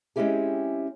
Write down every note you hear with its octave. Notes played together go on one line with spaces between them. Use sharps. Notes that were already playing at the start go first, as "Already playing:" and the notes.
G#3 C4 C#4 E4 G4 G#4